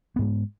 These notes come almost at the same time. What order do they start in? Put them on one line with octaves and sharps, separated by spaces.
B3 G#2 G#3